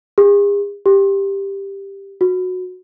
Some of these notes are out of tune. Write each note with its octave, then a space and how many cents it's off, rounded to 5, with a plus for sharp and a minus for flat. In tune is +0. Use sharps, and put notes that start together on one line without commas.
G#4 -45
G4 +10
F#4 -15